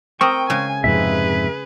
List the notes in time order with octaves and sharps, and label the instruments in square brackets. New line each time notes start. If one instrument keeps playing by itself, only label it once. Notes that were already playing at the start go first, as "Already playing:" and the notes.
[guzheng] C4 A#4 [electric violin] G5 [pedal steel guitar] C#6 D#6
[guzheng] C#3 G#3 [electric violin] G#5
[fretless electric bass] F2 G#2 C3 [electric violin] G#4 B4 [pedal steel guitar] E5